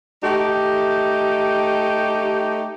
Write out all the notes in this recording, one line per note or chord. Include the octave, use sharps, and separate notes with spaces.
A3 D#4 G4